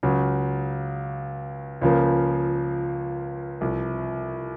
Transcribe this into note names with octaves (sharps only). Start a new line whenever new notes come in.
C#2 C#3 F#3
C#2 C#3 F3 A#3
C2 C3 F3